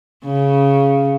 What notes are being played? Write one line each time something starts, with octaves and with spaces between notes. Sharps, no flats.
C#3